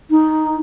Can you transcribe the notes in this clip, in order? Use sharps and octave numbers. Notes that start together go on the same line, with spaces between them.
D#4